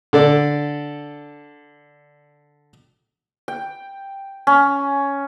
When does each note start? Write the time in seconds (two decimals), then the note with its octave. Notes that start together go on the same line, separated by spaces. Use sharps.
0.13 D3 A4 D5
3.48 G5
4.47 C#4